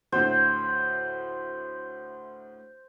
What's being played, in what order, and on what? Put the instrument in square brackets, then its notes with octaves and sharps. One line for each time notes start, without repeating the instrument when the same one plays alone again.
[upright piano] D2 A2 [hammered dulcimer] C5